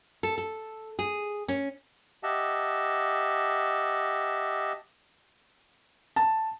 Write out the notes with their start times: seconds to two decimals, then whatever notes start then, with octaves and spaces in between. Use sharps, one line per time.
0.23 A4
0.38 A4
0.99 G#4
1.48 C#4
2.23 G4 D#5 E5 F#5 A5
6.16 A5